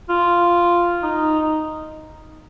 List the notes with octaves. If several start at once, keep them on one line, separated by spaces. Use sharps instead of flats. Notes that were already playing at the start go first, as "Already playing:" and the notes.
F4
D#4